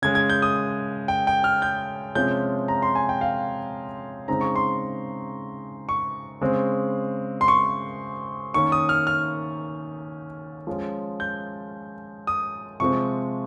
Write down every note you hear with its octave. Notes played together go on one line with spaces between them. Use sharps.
C#3 G#3 C#4 G#6
G#6
G6
D#6
G5
G5
F6
G6
C3 F3 G#3 C#4 G6
A#5
C6
G#5
G5
F5
C#3 G#3 C4 D#4 A#5
C#6
C6
C#6
C#3 G#3 C4
C6
C#6
D#3 A#3 C#4 C#6
D#6
F6
F6
F3 G#3 C#4
G6
D#6
C3 F3 G#3 C4 C#6